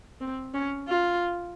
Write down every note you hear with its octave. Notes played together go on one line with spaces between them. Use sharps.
C4
C#4
F4